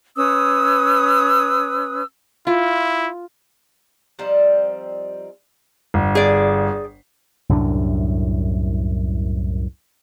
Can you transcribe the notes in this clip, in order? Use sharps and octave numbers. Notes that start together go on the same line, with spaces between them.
C#4 B4 D#6 E6
E4 F4
F3 G3 C4 D#4
G1
G#4 D5
C2 F#2 A2 D4